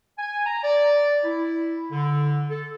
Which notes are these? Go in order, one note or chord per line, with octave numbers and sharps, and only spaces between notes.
G#5
A#5
D5
E4
D3
A4